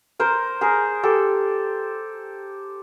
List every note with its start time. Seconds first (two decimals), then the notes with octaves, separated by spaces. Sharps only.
0.19 A#4 C5
0.61 G#4 A#4
1.03 G4 A4